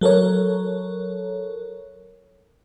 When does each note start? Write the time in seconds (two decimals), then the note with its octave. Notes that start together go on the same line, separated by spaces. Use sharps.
0.01 F#3 A4 A#4 C#5